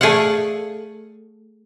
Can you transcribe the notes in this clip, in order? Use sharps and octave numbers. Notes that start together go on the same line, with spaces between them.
A3 G#4 D5 F5 F#5